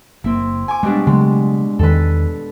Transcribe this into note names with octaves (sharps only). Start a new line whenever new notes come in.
F#1 A#3 C4 E4
G#5 D6
B2 G3 G#3 D4
C#3 F#3 G#3 A3
E2 D#3 A4 B4